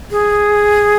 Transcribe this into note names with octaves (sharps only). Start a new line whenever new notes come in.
G#4